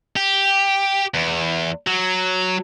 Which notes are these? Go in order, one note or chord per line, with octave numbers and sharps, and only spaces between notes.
G4
E2
F#3